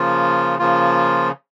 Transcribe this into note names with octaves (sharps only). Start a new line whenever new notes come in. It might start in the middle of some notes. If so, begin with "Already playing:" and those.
Already playing: C#3 F3 A#3 F4
C#3 F3 A#3 F4